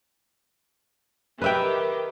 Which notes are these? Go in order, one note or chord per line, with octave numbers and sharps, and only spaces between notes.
D#3 G4 B4 E5 G5